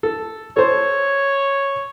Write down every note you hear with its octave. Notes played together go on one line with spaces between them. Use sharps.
A4
A4 C5 C#5